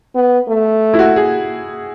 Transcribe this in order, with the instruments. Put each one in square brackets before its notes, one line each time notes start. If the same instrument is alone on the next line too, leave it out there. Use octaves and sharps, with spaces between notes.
[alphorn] B3
A3
[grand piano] E4
F#4
G#4